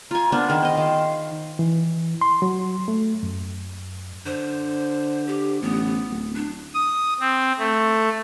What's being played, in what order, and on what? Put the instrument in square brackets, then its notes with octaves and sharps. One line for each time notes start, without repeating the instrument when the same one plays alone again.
[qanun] F4 G#5 [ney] A#5
[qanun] B3 D4 C5 [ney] A#4
[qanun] D#3 G#4
C5 D#5
[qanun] D#3 [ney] F5
[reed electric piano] E3
C6
F#3
A3
F#2
[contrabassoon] D3 [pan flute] C5
[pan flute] G4
[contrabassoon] A1 [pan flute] B3
[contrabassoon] D1
[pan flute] D4
[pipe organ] D#6
C4
A3